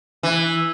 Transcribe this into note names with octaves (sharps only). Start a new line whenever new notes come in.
E3